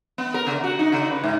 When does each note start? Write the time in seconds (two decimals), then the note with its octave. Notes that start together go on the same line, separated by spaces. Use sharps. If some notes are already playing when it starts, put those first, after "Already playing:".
0.18 B3
0.34 A#4
0.47 C#3
0.64 F#4
0.79 D#4
0.92 C#3
1.10 B4
1.24 G#2